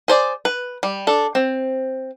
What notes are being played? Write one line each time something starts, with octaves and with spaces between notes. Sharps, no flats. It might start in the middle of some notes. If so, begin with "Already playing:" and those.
G#4 C5 D5
B4
G3
D4 A4
C4